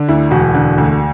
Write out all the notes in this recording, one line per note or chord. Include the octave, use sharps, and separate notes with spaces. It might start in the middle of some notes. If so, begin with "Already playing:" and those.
Already playing: D3
D2 E4
E1 F#4
D3
D2